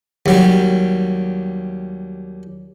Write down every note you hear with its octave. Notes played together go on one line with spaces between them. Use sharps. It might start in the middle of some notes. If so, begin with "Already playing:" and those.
D#2 F#3 G3